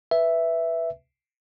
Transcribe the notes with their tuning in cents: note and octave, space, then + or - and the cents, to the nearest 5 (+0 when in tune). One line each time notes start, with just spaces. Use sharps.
B4 +0 E5 +0